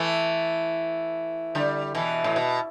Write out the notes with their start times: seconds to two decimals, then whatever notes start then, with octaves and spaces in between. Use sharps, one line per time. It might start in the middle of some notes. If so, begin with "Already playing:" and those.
Already playing: E3 A3
1.55 D3 G3
1.95 B2 E3
2.24 A2
2.36 B2